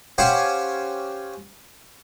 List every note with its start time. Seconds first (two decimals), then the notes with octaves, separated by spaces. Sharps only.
0.18 C#4 G4 C5 F5 F#5 G#5